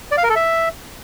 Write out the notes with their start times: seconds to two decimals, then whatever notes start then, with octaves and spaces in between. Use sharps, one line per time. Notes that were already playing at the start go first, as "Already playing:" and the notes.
0.12 D5
0.18 F5
0.24 A#4
0.30 A4
0.36 E5